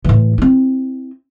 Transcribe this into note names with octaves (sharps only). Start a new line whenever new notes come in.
A2 E3
C4 E4